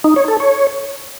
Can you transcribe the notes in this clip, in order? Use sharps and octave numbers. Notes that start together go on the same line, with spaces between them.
D#4
C#5
A4
C#5